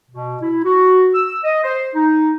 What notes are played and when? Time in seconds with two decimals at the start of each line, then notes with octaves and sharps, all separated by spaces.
0.11 B2
0.42 E4
0.65 F#4
1.14 E6
1.44 D#5
1.64 C5
1.95 D#4